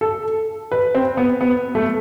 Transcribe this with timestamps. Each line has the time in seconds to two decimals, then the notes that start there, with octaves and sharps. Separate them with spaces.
0.01 A4
0.72 B4
0.95 C4
1.17 B3
1.41 B3
1.75 A3